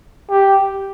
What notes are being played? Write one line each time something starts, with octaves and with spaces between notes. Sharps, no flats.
G4